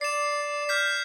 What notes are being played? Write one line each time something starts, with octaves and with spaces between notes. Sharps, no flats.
D5 C7 E7
F6 G6 B6